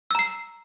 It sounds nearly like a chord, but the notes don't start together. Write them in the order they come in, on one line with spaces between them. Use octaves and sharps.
E6 A#5 C7